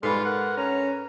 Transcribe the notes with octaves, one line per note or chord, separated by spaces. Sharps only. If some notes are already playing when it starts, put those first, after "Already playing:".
G#2 G3 F4 A4 B4 B5
A#4 F#5
C#4 A#5